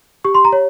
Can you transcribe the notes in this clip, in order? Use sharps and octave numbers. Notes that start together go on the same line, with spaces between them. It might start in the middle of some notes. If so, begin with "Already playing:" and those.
G4 C#6
C6
A#5
C#5